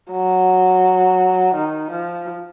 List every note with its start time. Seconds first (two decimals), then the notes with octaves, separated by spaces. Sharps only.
0.11 F#3
1.55 D#3
1.91 F3